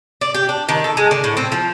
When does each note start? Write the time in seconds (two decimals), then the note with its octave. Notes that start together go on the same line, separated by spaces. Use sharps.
0.21 D5
0.34 G4
0.49 D4
0.69 D#3
0.84 A4
0.97 G#3
1.11 D3
1.24 A2
1.37 C4
1.52 F3